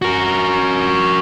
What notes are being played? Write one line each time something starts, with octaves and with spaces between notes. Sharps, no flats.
F#4 A#4